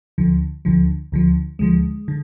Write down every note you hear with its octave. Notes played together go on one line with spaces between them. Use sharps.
D2 D3 F3
D2 D3 F3
D2 D3 F3
D2 D3 F3 G#3
D3